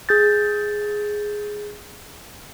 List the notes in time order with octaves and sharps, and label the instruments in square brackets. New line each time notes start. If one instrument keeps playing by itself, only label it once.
[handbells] G#4 G6 A6